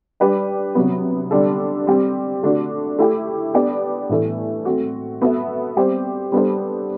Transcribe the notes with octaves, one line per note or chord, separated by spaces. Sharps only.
G3 D4 G4 B4 D5
C3 F#3 B3
D3 G3 D4 A4
G3 C4 G4
D3 A3 D4 F#4
A3 E4 G4
B3 D4 G4 D5
A2 E3 A3
A3 C4 F#4
B3 F#4 A4 E5
G3 C4 G4 C5
G3 B3 D4 A4 C5